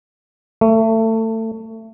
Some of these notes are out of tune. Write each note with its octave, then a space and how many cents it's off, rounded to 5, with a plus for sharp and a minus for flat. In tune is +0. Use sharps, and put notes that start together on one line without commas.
A3 +25